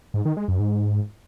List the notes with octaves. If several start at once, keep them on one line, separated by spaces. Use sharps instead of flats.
G#2
D#3
G#3
F#2
G#2